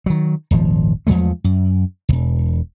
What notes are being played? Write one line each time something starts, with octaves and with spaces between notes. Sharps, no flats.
D#3 F#3
D#1 G#1 F3
E2 F3 G#3 A3
F#2
E1 C#2